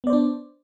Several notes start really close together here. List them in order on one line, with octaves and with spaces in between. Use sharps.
B3 D5 C5 D4